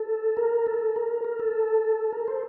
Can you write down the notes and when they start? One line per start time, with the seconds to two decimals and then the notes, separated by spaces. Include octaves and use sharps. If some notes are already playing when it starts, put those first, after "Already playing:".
Already playing: A4
0.37 A#4
0.67 A4
0.96 A#4
1.24 A#4
1.39 A4
2.12 A#4
2.28 A4 C5